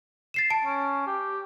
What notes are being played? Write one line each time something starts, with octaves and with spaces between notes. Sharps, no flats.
A6 C7 E7
A5 D7
C#4
G4